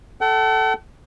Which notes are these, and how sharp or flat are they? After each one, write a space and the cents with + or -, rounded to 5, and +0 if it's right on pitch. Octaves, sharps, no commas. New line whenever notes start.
A4 +0 F#5 +45